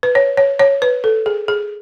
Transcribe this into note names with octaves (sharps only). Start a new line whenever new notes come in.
B4
C#5
C#5
C#5
B4
A4
G#4
G#4